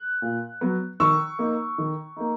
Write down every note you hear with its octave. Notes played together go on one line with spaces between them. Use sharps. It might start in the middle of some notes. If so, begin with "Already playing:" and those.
Already playing: F#6
A#2
F#3 B3
D#3 C#6 E6
A#3 D#4
D#3
A#3 D#4